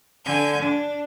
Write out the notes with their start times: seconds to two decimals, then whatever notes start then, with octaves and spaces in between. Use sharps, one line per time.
0.24 D3 G#5 G6
0.61 D4